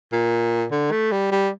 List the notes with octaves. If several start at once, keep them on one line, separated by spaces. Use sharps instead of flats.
A#2
D3
A3
G3
G3